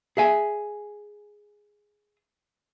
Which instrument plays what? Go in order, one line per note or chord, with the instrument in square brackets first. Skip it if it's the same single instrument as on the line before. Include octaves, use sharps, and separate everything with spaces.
[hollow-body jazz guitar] G#4 E5 G#5